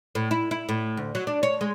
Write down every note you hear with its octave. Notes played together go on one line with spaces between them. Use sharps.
A2
E4
E4
A2
D2
F#3
D4
C#5
G#3